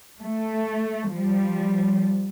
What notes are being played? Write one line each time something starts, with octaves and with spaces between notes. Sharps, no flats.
A3
F3 G3